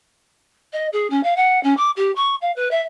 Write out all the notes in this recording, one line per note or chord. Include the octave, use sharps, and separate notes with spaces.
D#5
G#4
C#4
F5
F#5
C#4
D6
G4
C#6
F5
B4
E5